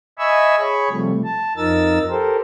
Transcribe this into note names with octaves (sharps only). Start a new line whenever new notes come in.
D#5 E5 G#5 B5 C#6 E6
G#4 C#5 B5 C#6
C3 F3 G3 A3
A5
F2 F3 D#4 A#4 E6 A6
G4 A4 A#4 C5